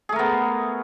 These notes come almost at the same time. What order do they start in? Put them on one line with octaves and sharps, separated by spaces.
G#4 A3 A#4 B3